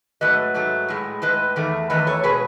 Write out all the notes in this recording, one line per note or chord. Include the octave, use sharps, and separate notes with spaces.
G#2 F#3 A3 B4 D#5
G#2 F#3 A3
A2 G#3
A2 G#3 B4 D#5
E2 D#3 A3
E2 D#3 A3 B4 D#5
A4 C#5
B2 G#3 G#4 B4